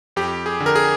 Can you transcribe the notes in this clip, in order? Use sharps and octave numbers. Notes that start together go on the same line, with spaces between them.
F2 G4
G#4
D3
A#4
G#4